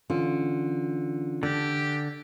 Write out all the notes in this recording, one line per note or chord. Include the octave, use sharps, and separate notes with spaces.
D3 E3 C#4 F4
D3 D4 G4